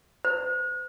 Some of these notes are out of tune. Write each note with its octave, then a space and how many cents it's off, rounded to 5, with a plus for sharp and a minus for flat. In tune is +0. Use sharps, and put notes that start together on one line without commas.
C5 -45